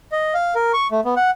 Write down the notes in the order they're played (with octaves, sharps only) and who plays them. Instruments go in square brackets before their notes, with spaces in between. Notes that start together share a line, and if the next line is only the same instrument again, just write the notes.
[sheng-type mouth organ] D#5
F5
A#4
C#6
A3
B3
F#5